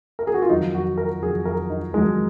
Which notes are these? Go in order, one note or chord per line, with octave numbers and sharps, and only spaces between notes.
A#4
G#4
F#4
F4
F2 D#3 F#3 D#4
F#4
A#4
F2 D#3 F#3 G#4
A#4
D#4
F2 D#3 F#3 G#3